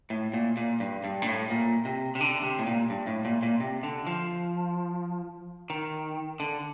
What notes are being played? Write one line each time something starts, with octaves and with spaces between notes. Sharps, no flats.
A2
A#2
A#2
G2
G2
A#2
A2
A#2
C3
C3
D3
C3
A2
A#2
G2
A2
A#2
A#2
C3
D3
F3
D#3
D3